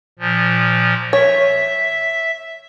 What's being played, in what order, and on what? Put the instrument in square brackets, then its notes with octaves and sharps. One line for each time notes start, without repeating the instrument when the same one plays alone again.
[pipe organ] A#2 F3
[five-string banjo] C#5 [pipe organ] E5